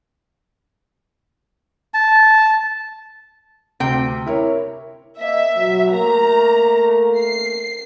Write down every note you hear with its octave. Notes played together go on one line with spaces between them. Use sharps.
A5
D2 C3 G5
E4 A#4 C#5
A#3 D#5 E5
B2 F#3
A3 A#3 A#4 A#5
C7